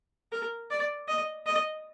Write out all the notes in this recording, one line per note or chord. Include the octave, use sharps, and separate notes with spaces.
A#4
D5
D#5
D#5